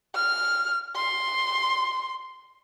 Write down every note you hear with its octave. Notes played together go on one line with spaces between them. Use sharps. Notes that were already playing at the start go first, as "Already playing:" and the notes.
F6
C6